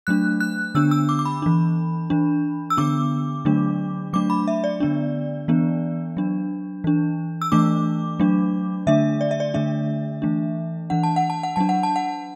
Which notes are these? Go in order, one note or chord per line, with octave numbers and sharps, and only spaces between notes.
F#3 A3 D4 F#6
F#6
D3 B3 D4 E6
E6
D6
D6
B5
E3 D4
E3 D4
E6
D3 B3 D4 D6
D3 F#3 A3 D4
F#3 A3 D4 D6
B5
E5
D5
D3 B3 D4
E3 B3 D4
F#3 D4
E3 D4
E6
E3 A3 D4 D6
F#3 A3 D4
D3 A3 D4 E5
D5
E5
D5
D3 A3 D4 E5
E3 A3 D4
E3 D4 F#5
A5
F#5
A5
F#5
F#3 D4 A5
F#5
A5
F#5